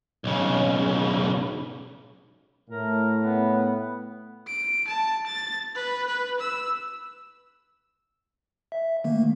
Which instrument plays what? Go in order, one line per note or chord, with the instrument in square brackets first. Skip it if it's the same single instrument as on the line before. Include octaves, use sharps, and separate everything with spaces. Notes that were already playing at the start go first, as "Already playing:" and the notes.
[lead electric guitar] B1 C#3
[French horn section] A2 [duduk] A#4
[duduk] B3
[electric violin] D7
A5
A6
B4
B4
E6
[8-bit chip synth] E5
D#3 A3 A#3